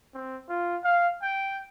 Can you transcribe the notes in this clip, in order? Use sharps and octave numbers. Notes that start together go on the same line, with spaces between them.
C4
F4
F5
G5